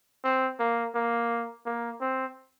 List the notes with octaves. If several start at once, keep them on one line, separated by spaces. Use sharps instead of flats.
C4
A#3
A#3
A#3
C4